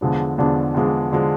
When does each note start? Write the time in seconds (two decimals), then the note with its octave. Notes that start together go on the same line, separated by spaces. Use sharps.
0.01 E2 D3 F3 G#3 D4
0.38 E2 D3 F3 G#3 D4
0.74 E2 D3 F3 G#3 D4
1.13 D3 F3 G#3 D4